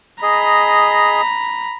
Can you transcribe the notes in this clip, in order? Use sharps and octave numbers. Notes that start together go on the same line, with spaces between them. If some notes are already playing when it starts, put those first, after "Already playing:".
G#4 D#5 A#5 B5